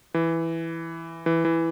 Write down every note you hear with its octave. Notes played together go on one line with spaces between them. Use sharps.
E3
E3
E3